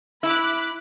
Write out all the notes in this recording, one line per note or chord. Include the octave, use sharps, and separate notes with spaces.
E4 B5 D6 F#6